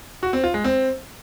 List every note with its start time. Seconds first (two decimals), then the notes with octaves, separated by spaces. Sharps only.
0.23 F#4
0.33 C4
0.44 F4
0.54 G#3
0.64 C4